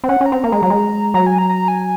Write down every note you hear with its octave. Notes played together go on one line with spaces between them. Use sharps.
C4
C#4 F#5
C#4
A#5
C4
A#3
G#3
F#3
G#3
F#3 A#5
G#5
A#5
A#5
G#5